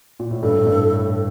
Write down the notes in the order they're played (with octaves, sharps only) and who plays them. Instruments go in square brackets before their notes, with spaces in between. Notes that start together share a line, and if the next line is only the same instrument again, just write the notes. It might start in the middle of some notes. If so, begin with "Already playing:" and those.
[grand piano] A#2
A2
[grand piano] G2 [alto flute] A4
[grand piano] A2
G2
A2